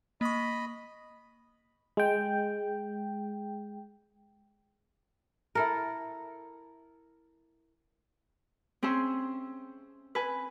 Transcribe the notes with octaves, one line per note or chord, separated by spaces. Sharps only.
A#3 D#5 B5 C#6
G#3 G5
E4 A4 A#4
C4 C#4 G#4 E5 C6
B4 G#5